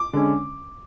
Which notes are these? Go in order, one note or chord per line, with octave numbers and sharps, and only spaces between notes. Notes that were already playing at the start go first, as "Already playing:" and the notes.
Already playing: D6
D3 G#3 C#4